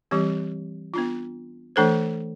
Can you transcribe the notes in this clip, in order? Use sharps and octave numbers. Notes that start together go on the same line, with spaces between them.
E3 G3 C4 G4
B3 D4 F4
E3 A3 D4 A4 C5